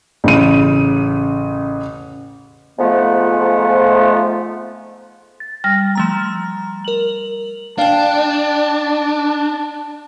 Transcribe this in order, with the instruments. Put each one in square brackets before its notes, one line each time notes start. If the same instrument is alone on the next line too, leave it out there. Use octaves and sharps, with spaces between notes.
[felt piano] A1 C#3 D#7
[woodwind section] F2 G#2 F3 A3 B3
[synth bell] A6
[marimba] G3 F6 A#6
[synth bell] F3 A3 A#5
A#4 F#7
[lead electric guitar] D4 [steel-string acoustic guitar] F5 G5 [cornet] A5